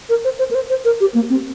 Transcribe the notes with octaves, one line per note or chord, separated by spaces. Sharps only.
A#4
C5
C5
A#4
C5
C5
A#4
G4
A#3
C4